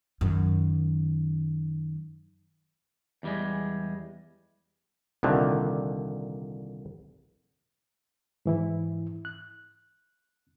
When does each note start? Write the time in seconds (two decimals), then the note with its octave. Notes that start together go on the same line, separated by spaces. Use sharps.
0.21 F#2 D#3
3.23 E2 G3 G#3
5.23 C2 A#2 D3 D#3
8.46 G#2 E3 E4
9.25 F#6